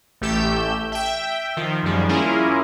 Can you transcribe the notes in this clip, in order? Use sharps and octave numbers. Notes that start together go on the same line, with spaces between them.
A1 A3 G4 E6 G6
E5 G5
D#3 F3
F#2 D#3 F3 G3 G#3
A#3 C#4 E4 F4 G#4 A#4